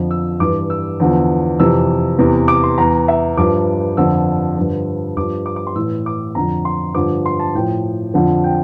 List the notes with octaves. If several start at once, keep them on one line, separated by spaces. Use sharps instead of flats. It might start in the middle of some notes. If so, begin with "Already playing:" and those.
Already playing: F2 D3 F3
E6
G2 E3 D6
E6
E2 D3 F3
F2 C3 E3 E6
E2 C3 E3
D6
C6
E2 E3 A#5
E5
G2 F3 D6
F2 D3 F3 E6
G2 D3 F3
G2 F3 D6
D6
D6
C6
A2 E3 E6
D6
F2 D3 F3 A#5
C6
G2 D3 F3 D6
C6
A5
A2 F3 G5
F2 D3 F3
G5